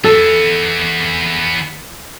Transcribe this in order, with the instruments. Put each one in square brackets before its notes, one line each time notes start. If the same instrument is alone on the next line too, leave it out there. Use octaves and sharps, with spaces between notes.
[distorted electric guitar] E3 B3 [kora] A4